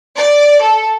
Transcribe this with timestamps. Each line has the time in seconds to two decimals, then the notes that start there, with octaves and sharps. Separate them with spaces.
0.17 D5
0.62 A4